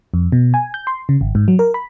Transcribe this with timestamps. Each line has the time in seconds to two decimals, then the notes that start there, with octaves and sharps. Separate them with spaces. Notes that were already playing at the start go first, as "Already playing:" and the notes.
0.14 F2
0.32 B2
0.54 G#5
0.74 G6
0.87 C6
1.09 C#3
1.21 G#1
1.35 G#2
1.48 F#3
1.59 A#4
1.74 B5